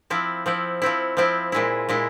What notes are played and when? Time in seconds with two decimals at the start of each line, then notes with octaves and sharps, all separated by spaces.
0.10 F3 C4 E4
0.46 F3 C4 E4
0.82 F3 C4 E4
1.17 F3 C4 E4
1.52 A#2 G#3 E4
1.89 A#2 G#3 E4